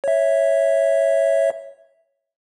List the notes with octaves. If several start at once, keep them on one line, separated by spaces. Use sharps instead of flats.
C#5 E5